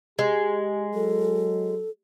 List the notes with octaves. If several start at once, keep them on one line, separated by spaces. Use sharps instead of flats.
G#3 G4
F#3 A4